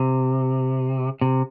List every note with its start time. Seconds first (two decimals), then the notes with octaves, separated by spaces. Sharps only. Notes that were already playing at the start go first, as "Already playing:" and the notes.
Already playing: C3
1.21 C3